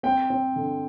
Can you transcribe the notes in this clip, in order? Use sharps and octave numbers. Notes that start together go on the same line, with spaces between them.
C4 G5
C4
D3